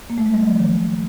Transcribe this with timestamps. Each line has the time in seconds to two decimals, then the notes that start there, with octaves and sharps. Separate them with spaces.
0.10 A#3
0.18 A3
0.26 G#3
0.34 G3
0.43 F#3
0.51 F3
0.59 D#3